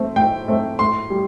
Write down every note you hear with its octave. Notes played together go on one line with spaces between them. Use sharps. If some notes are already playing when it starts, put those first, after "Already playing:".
Already playing: A3 C4
A2 G5
A3 C4
A2 C6
G3